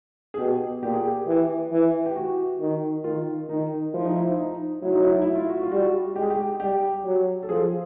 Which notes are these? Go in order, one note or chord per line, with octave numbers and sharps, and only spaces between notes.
G#4
B2 G4
A#2 G4
G#4
G4
E3
E3
G4
F#4
D#3
D#3 F4
D#3 D#4
F3 E4
D#4
E4
D#4
F#3 E4
D#4
E4
E4
F4
F#4
F4
G3 F#4
G#3 G4
G#4
G4
G3 G4
F#3
A4
F3 G#4